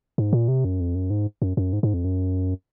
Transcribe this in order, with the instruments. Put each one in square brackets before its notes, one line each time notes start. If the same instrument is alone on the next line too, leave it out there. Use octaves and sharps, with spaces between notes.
[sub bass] G#2
A#2
C3
F#2
F2
F#2
G#2
F#2
F#2
G#2
G#2
F2
F#2